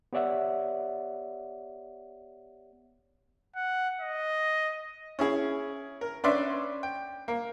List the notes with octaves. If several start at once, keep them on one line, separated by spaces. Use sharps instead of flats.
B3 G4 C#5 D5 E5 F#5
F#5
D#5
C#4 E4 G#4
A#4
C#4 D4 B4 D5 E5 C6
G5
A#3